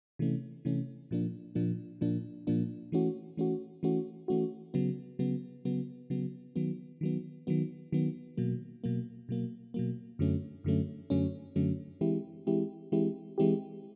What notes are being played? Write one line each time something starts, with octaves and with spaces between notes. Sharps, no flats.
C3 E3 A3 C#4
C3 E3 A3 C#4
A#2 F3 A#3 D4
A#2 F3 A#3 D4
A#2 F3 A#3 D4
A#2 F3 A#3 D4
E3 A3 C#4 F#4
E3 A3 C#4 F#4
E3 A3 C#4 F#4
E3 A3 C#4 F#4
C#3 F#3 B3
C#3 F#3 B3
C#3 F#3 B3
C#3 F#3 B3
D#3 F#3 B3
D#3 F#3 B3
D#3 F#3 B3
D#3 F#3 B3
B2 F#3 A#3
B2 F#3 A#3
B2 F#3 A#3
B2 F#3 A#3
F#2 D3 F#3 A3 C#4
F#2 D3 F#3 A3 C#4
F#2 D3 F#3 A3 C#4
F#2 D3 F#3 A3 C#4
E3 G#3 C4 E4 G4
E3 G#3 C4 E4 G4
E3 G#3 C4 E4 G4
E3 G#3 C4 E4 G4